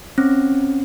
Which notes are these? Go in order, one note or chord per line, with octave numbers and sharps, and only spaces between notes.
C4 C#4